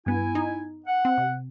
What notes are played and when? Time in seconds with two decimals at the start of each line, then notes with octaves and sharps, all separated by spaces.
0.06 G2 B3 E4 G#5
0.35 D#4
0.87 F#5
1.05 C4
1.18 C3